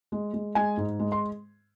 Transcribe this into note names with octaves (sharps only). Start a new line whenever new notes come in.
G#3
G#3
G#3 G#5
G#2
G#3
C6